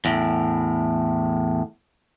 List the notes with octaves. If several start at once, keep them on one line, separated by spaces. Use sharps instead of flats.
E2 A2